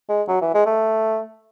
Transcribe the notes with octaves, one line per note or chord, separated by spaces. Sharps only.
G#3
F#3
E3
G#3
A3